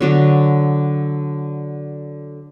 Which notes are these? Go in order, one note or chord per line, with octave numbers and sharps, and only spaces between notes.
D3 F#3 D4